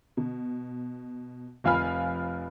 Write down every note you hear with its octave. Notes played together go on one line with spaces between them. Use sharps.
B2
F1 F3 F5 G#5 B5 F6